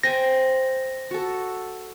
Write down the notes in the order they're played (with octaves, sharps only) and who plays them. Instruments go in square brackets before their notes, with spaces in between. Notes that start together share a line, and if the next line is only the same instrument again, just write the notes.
[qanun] C5 G5 G#5 [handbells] A#6
[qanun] F#4 A4